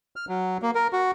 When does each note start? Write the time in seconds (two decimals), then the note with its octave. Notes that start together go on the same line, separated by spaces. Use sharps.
0.16 F6
0.29 F#3
0.62 A#3
0.75 A#4
0.93 F#4